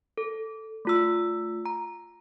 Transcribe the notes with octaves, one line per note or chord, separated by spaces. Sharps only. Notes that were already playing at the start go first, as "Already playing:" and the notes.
A4
A3 F4 E6
A#5